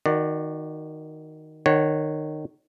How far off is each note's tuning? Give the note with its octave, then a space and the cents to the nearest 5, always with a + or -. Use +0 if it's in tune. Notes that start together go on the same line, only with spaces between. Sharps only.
D#3 +0 F#4 +0 D5 +30
D#3 -25 C#5 -15 F#5 +0